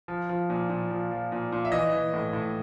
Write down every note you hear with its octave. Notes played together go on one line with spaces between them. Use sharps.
F3
F3
A#2
A#2
F3
F3
A#2
A#2
E5
E3 D#5
E3
A2
A2